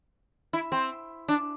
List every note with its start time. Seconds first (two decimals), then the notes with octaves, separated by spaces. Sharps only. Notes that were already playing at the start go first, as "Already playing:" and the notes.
0.53 E4
0.72 C4
1.28 D4